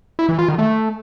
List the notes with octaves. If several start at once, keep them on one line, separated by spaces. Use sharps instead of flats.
E4
E3
F4
D#3
A3